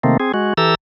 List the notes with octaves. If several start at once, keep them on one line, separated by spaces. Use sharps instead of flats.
C3 D#3 A3 A#3 C4
C4 G#4
G#3 F#4
E3 G4 A4 A#5 E6